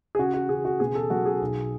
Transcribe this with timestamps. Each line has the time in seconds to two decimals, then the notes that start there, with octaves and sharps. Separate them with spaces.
0.15 G#4
0.19 C#3 F#4
0.34 F#4
0.49 C#3 G#4
0.65 F#4
0.80 B2 G#4
0.95 A4
1.10 F#3 F#4
1.26 G#4
1.41 B1